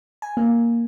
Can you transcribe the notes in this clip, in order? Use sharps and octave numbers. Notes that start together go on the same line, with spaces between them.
G#5
A#3